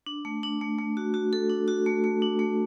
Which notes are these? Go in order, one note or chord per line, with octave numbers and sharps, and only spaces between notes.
D4
A3
D4
A3
A3
F#4
F#4
A4
D4
F#4
A3
A3
D4
A3